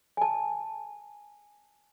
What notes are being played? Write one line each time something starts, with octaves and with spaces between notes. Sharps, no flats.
G#5 A5